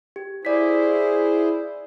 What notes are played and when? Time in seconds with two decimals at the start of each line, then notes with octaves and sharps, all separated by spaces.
0.16 G4
0.45 E4 G#4 C5 D5 B6